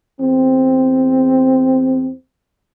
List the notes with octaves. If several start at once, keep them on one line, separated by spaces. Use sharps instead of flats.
E2 C4